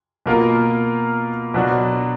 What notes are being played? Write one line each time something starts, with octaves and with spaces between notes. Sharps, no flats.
B2 A#3 F4 A#4
B2 F#3 D4 F#4